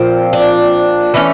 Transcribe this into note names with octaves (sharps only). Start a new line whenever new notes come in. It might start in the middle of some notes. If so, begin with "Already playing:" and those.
Already playing: A#2 F3 C4
D4
E3 A3 C#4